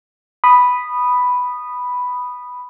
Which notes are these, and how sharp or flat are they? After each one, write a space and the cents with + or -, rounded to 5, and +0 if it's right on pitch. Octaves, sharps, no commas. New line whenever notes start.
B5 +0 D#6 -15